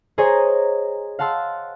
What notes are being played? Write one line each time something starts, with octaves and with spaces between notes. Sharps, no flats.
G#4 C5 C#5 D#5 G#5 A#5
F5 F#5 A5 C6 E6